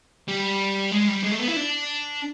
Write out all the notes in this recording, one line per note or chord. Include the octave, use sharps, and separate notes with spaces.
G3
G#3
G3
G#3
A3
B3
E4
D4